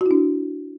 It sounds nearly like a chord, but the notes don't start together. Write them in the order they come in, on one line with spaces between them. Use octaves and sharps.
F#4 E4 D4